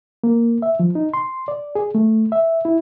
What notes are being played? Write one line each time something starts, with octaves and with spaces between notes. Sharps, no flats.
A#3
E5
F3
D#4
C6
D5
G#4
A3
E5
E4